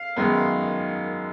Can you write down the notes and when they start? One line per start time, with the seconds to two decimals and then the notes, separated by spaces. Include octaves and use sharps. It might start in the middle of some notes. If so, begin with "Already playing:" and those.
Already playing: F5
0.16 F#2 D#3 G#3 B3